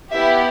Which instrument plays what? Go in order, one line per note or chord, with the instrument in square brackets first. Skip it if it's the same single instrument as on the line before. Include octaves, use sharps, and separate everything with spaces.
[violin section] B3 E4 G4 E5